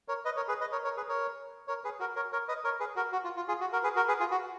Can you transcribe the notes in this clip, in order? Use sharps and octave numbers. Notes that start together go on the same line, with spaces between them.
A#4 C#5
B4 D#5
A#4 C#5
G#4 B4
B4 D#5
A#4 C#5
A#4 C#5
G#4 B4
A#4 C#5
A#4 C#5
G#4 B4
F#4 A#4
A#4 C#5
A#4 C#5
B4 D#5
A#4 C#5
G#4 B4
F#4 A#4
F#4
F4
F4
F4 G#4
F#4
F#4 A#4
G#4 B4
F#4 A#4
G#4 B4
F4 G#4
F#4